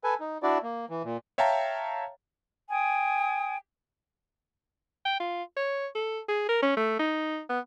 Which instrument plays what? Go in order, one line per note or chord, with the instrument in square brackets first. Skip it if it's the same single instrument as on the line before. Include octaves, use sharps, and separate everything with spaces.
[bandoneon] A4 B4 G#5
D#4
D4 E4 F#4 D5
A#3
E3
A#2
[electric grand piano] C#5 E5 F5 G5 A5 A#5
[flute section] G5 G#5 D#6
[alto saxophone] G5
F4
C#5
A4
G#4
A#4
C#4
A3
D#4
B3